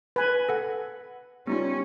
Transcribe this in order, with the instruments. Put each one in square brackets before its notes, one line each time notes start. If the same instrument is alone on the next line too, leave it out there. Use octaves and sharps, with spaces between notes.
[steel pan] B4 G#5
[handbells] A4 F#5
[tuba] G3 [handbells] B3 D#4 F4 [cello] C#4